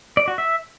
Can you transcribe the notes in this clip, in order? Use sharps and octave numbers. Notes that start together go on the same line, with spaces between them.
D5
F#4
E5